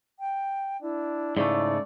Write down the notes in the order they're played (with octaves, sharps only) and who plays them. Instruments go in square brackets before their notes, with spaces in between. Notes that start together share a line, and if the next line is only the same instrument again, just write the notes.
[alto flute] G5
[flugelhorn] D4 [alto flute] E4
[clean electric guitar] G#2 C#3 A3 [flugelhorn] D5